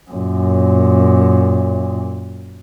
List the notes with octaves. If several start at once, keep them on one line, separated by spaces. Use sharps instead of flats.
F#2 A#2